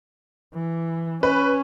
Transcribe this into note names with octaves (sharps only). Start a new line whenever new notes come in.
E3
C#4 B4